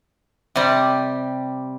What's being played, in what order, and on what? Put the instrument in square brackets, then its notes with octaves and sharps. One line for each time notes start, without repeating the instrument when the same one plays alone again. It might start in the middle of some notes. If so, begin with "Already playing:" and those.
[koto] C3 G3